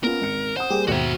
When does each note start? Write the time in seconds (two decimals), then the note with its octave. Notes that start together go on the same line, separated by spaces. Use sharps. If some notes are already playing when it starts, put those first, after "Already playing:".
0.03 B3 C#4 F4 A#4
0.21 G#1 C#7
0.57 C5 F#5 D#6
0.70 G3 A#3 G4 G#4
0.87 D#2 G#2 B2 F#4 C5 E5 F#5 G5